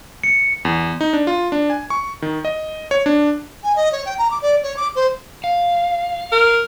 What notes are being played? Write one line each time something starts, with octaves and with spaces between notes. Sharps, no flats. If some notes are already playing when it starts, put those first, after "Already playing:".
C#7
E2
D#4
D4
F4
D4
G#5
C#6
D#3
D#5
C#5
D4
G#5
D#5
C#5
G5
A#5
D6
D5
C#5
D6
C5
F5
A#4